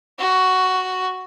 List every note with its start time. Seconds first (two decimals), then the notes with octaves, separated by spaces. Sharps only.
0.19 F#4